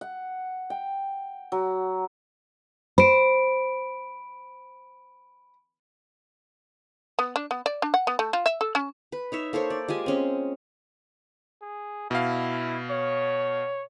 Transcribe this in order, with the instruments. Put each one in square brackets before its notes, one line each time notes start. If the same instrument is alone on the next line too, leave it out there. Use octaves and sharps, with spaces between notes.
[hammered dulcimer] F#5
G5
F#3
[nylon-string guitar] C5 [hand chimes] B5 D7
[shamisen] B3
D4
B3
D5
D4
F#5
B3
A3
F4
E5
A4
C#4
[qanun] B4
D#4 C#5 E5
A#3 A4 C5 C#5
D5
G#3 F4 G4 G#5
C4 C#4 G#4
[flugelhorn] G#4
[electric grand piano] B2 F5 [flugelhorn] E4
[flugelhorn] C#5